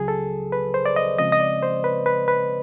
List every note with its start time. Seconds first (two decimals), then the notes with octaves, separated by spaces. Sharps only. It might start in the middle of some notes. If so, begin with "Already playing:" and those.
Already playing: C#2 C#3 F#3 G#4
0.08 A4
0.52 B4
0.74 C5
0.86 D5
0.96 D#5
1.19 C#3 F3 G#3 C4 D#5
1.32 D#5
1.40 D5
1.63 C5
1.84 B4
2.06 B4
2.28 B4